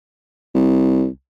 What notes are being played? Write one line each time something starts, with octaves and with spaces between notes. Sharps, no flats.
C2